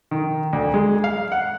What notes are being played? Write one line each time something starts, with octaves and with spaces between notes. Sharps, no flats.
D#3
D2
G#3
F5
F#5